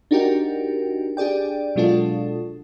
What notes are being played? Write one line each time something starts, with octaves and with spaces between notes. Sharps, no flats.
D4 D#4 F#4 G4 A#4 G5
D4 G4 G#4 D5 G5
B2 F#3 G#3 D4 F4 A4